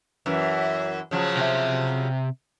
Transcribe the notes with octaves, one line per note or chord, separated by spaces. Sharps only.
F#2 E3
C#3 F3 F#3
C3 E5